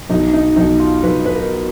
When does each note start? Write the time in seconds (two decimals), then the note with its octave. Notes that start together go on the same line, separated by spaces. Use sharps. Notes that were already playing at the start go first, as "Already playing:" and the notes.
0.10 B1 D#4
0.33 D#4
0.56 B1 D#4
0.79 F4
1.03 B1 B4
1.25 B4
1.34 A#4